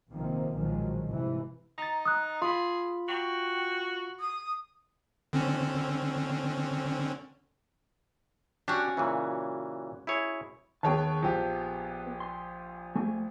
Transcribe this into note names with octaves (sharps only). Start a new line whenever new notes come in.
A#1 C3 D#3 F3 A#3 C4
B1 A#2 D#3 F3 F#3 G#3
F1 G#2 C3 E3
D#4 A#5 A6
D#6 F#6
F4 G#4 B5 C6
F#4 G5
D#6
D3 C4 C#4
C#4 D4 F#4 G4
A#2 C#3 E3
E4 G#4 C#5
D#2 B3 G#4 C#5 G5 A5
A#1 F3 G4
C6
A3 G#5